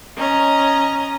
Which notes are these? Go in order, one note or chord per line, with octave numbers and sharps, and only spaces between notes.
C#4 D#5 A#5